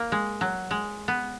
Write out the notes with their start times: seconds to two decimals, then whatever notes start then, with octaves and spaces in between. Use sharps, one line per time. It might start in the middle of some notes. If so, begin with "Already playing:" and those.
Already playing: A#3
0.12 G#3
0.41 F#3
0.71 G#3
1.08 B3